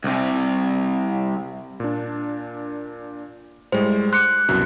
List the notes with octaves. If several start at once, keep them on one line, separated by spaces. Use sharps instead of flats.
C2 C3
A#2 D4
A2 G3 G#3 C5
C6 D6 F#6 C#7
C2 F#2 B2